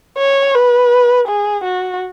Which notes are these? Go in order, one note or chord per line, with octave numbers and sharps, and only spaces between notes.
C#5
B4
G#4
F#4